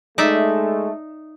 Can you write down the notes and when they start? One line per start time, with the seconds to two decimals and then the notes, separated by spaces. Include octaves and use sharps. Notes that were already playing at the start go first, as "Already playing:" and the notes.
0.18 G#3 A3 D#4 D5 E5